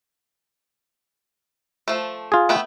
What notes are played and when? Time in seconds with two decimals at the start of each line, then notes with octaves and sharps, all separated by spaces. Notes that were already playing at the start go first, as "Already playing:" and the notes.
1.88 F3 A3
2.32 F4 G#4
2.49 A3 B3 G5